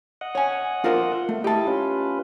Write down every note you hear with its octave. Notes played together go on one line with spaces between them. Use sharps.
D#5 F#5
C#5 G#5
F4 A#4 C5
A3
E4 G4 D#5 A5
C#4 F4 B4